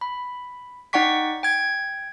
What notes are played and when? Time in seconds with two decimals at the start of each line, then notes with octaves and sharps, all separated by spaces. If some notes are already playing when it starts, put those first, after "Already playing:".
0.01 B5
0.93 D#4 D5 F#5 G5 C#6 B6
1.43 G5 G#6